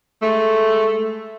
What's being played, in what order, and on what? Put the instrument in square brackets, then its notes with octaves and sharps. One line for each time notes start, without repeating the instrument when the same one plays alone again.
[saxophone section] G#3 A3